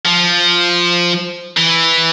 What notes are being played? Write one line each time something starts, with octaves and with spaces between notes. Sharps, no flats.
F3
E3